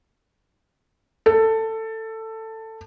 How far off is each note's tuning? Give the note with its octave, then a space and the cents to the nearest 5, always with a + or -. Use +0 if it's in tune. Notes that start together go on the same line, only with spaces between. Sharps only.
A4 +15